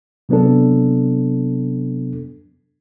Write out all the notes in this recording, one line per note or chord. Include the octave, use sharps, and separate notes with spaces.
C3 F#3 B3 D4 A4